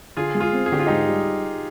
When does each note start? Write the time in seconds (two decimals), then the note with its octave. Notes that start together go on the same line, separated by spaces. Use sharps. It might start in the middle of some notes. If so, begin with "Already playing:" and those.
0.17 D3 F4 G#4
0.35 G#3
0.40 F4 G#4
0.53 C4
0.66 G#4
0.72 D3 G4
0.79 F4
0.87 G#2 D#4 G4
1.08 G3